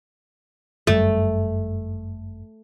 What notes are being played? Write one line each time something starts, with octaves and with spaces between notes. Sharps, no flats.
G1 F#2 G3 A3